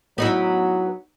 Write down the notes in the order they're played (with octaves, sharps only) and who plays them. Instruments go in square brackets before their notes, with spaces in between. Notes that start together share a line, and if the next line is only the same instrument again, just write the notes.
[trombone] F#3 [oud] B3 D#4 E4